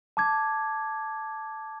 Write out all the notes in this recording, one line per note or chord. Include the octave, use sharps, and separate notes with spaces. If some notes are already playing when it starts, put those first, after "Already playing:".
A5 D6 G#6